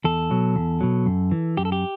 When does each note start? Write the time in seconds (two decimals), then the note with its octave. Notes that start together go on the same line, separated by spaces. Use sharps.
0.04 E2 A4
0.31 B2 F#3
0.56 E2
0.81 B2 F#3
1.06 F#2
1.31 E3
1.57 F#2 G4
1.65 A4
1.72 G4